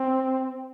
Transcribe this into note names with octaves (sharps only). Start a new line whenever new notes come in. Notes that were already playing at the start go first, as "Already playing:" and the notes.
Already playing: C4